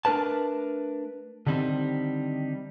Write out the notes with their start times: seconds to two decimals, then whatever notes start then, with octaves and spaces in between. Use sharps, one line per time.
0.05 A3 D4 A#4 B4 A5
1.47 D3 D#3 G3 C4 D#4